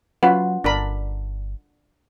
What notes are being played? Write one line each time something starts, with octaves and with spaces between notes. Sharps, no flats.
F#3 C#4 F4 B4 F#5
G1 D4 A#4 B5